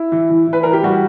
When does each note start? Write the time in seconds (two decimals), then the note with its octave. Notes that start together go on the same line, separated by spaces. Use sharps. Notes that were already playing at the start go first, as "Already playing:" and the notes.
Already playing: E4
0.12 E3
0.30 E3
0.47 E3
0.53 B4
0.63 E3 A#4
0.73 G4
0.83 G3 F#4